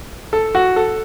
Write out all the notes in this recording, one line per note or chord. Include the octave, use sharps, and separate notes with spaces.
A4
F#4
A4